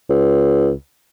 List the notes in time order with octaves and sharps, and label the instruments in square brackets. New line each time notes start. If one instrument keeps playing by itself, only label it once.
[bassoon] C#2